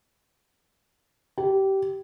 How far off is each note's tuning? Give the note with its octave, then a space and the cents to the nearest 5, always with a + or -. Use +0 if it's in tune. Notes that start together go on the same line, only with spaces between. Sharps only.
G4 -20